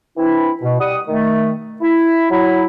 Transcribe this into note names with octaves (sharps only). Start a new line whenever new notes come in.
E3 C4 D4 E4
B2
G3 F#5 D#6
D#3 A3
E4
F#3 E4